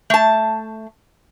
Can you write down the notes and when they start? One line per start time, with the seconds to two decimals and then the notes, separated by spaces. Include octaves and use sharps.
0.10 A3 A5